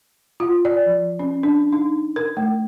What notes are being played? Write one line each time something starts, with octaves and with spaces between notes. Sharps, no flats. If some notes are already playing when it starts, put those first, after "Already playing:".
F4
D5
F3
C#4
D4
D#4
A#4
A3